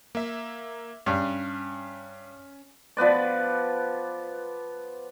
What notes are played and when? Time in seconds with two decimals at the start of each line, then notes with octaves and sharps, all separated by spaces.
0.15 A#3 E5
1.06 G2 C#4
2.97 F3 B3 B4 D5